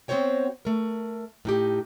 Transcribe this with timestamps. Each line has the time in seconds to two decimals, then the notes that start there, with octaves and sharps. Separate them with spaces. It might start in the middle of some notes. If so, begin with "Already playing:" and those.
0.08 B3 C4 F#4 C5 C#5 G5
0.65 A3 A#4
1.45 A2 D#4 G4